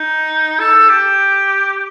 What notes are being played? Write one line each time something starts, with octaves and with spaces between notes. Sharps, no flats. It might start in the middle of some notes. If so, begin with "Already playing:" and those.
Already playing: D#4
A4
G4